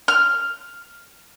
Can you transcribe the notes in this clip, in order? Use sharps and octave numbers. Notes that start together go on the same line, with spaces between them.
F6